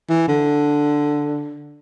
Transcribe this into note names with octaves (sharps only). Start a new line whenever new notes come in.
E3
D3